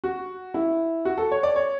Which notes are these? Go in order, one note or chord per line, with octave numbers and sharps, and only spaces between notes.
F#4
E4
F#4
A4
C#5
D5
C#5